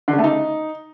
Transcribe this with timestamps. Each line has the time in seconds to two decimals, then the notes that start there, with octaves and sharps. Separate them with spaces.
0.08 D3
0.13 C#3
0.18 A3
0.24 D#4